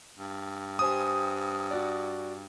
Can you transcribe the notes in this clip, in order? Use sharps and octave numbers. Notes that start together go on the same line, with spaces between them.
G2
G4 C5 G#5 D#6
F#4 D5